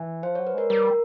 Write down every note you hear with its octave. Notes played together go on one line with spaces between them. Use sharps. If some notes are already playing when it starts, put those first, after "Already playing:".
Already playing: E3
F3 C5
C#5
F#3
B4
G#3 A#4
G3 A#4